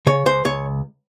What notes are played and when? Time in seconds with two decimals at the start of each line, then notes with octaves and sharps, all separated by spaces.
0.07 C#3 C#5
0.26 C#2 C5
0.45 C#2 C#5